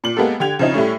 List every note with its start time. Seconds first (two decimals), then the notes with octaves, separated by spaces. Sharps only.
0.04 A#2 F#7
0.17 G#3 A#3 B3 G4 A4
0.40 D3 G4 G5 G#6 F7
0.59 C#3 F3 C4 D#4
0.74 A2 G3 A3 C#4